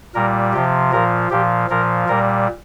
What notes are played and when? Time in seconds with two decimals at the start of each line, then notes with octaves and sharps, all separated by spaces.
0.15 A#2 G3 A#4
0.53 C3 F3 G4
0.92 A#2 F3 A#4
1.30 A#2 F3 G4
1.70 A#2 F3 A#4
2.08 A#2 G3 A#4